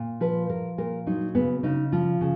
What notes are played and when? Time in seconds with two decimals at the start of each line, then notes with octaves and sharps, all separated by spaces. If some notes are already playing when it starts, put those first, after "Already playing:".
Already playing: A#2
0.21 F3 B4
0.49 F3 A#4
0.78 A#2 A#4
1.07 F#3 D#4
1.35 C#3 B3
1.63 C#3 D#4
1.92 F3 F4
2.21 C#3